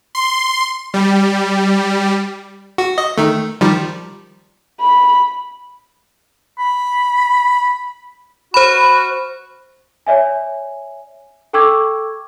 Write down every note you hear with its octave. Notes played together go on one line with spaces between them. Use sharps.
C6
G3
F#4
D#5
D#3 A3
D#3 F3 G3
B5
B5
F#4 C5 B5
C#5 D5 E5 G#5
A4 G5 C#6 D6 E6 G#6